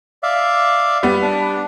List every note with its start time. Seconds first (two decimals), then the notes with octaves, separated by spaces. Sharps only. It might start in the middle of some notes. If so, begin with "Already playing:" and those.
0.23 D5 E5 F5
1.03 G3 B3
1.22 D4